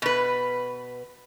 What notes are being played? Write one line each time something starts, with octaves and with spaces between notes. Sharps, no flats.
B2 B4